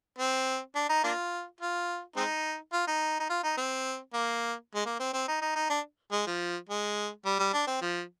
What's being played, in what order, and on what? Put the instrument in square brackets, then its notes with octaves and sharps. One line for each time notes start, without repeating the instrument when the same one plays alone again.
[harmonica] C4
D4
D#4
A#3 D4 F4
F4
G#3 C4 D#4
F4
D#4
D#4
F4
D#4
C4
A#3
G#3
A#3
C4
C4
D#4
D#4
D#4
D4
G#3
F3
G#3
G3
G3
D4
C4
F3